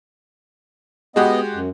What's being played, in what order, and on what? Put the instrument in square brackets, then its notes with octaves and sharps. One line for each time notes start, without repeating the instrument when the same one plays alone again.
[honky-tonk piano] G#3 F#4 G4 [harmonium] B3 D#5
[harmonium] F#2